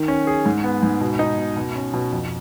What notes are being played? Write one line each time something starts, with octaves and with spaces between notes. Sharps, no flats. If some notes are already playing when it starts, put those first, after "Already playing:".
Already playing: D#3
C#4
G#4
G#2
B3
G#2
B2
D#4
B2
B2
C#4
B2
F2